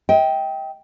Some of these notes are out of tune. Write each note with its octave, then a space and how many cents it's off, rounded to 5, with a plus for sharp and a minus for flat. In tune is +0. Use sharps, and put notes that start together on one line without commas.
D#5 +40 G5 +0